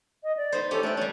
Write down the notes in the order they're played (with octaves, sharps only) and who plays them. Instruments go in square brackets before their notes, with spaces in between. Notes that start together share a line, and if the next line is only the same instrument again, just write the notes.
[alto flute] D#5
D5
[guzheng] B3 D#4 C5
[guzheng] F3 C#4 G4 [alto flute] A4
[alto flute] A3 [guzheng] D4 G5
[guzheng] G3 C#4 [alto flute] C#5